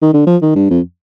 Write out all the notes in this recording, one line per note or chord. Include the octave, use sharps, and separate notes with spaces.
D#3
D3
F3
D#3
G2
F2